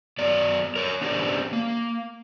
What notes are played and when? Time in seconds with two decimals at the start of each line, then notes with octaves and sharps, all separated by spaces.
0.19 F#3 B3 D5
0.76 A#4 C#5
1.01 B3 C#4 D4 G4 C5
1.53 A#3